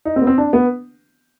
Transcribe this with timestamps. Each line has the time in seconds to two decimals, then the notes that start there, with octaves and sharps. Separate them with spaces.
0.05 D#4
0.16 C4
0.22 B3
0.27 C4
0.38 D4
0.53 B3